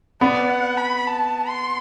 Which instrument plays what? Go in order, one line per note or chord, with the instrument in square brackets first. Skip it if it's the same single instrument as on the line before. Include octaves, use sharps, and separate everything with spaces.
[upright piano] B3 [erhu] D5
[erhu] F#5
B5
A5
C6